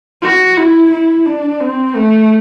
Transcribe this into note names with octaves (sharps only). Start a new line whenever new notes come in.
F#4
E4
E4
D4
C4
A3